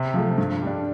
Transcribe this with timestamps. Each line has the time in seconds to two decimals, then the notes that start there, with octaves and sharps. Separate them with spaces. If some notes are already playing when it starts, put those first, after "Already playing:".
Already playing: C3
0.14 F3 A3
0.38 G2
0.62 G3 D4